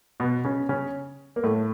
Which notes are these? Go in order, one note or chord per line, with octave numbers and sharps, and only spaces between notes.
B2 B3
C#3 C#4
C#3 C#4
A#3
A2 A3